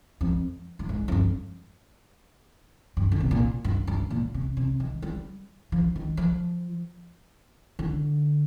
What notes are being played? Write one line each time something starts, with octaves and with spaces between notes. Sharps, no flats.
F2
G2
G#2
F2
G2
G2
D3
C3
A#2
G2
G2
A#2
C3
C3
D#3
G3
F3
D#3
F3
D3